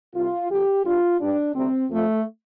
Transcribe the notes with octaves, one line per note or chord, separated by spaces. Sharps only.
C2 C3 G3 F4
F2 D3 G3 G4
G2 G3 F4
G2 G3 D4
D2 C3 G3 C4
F2 F3 A3